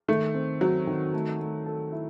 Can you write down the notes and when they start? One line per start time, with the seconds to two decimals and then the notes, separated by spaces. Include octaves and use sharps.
0.08 D#3 A3
0.34 C4
0.61 F#3 C4
0.87 D#3
1.13 A3
1.40 A3
1.66 A4
1.92 E4